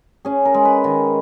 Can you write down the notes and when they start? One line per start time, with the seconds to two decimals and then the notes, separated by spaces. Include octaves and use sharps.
0.25 C#4 G#4
0.45 A#4
0.54 G#3
0.65 B4
0.84 D#3